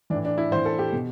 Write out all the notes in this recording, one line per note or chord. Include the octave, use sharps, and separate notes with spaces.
E3 D4
A2
D4
E4
A2 E3 C5
A4
G4
B2